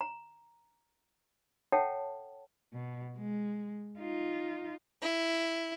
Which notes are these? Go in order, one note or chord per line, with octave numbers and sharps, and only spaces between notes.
A#5
A4 C#5 E5 F#5 G5 A5
B2
G#3
D#4 F4
E4